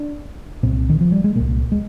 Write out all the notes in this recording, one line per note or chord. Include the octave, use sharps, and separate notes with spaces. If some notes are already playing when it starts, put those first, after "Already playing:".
Already playing: D4
C2 A#2 C4
D#3
F3
G3
G#3
C2 A#2 A#3
G#3